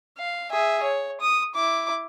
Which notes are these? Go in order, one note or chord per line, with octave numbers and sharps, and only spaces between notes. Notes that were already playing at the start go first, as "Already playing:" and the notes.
F5
G#4 E5
C#5
D#6
E4 D6